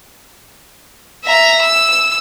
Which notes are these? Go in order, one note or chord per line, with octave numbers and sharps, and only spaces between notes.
E5 A#5
E6